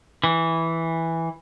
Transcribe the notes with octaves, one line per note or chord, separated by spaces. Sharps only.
E3